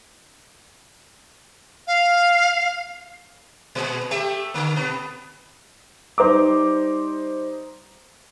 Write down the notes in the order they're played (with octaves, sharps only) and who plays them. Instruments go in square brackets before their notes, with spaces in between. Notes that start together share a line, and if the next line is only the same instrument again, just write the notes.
[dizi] F5
[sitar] A#2 G#3
A3 G4 E5
D3 A#3
B2 B3
[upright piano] G3 D#4 C5 A#5 D6